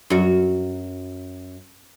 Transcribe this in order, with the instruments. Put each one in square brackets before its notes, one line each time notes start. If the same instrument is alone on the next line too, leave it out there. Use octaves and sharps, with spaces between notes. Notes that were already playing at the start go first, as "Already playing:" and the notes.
[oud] F#2 F#4